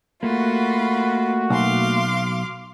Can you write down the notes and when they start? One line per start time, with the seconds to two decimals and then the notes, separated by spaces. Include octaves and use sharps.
0.23 A3 A#3 F4 F#4 B5
1.50 B1 F5 C6 D6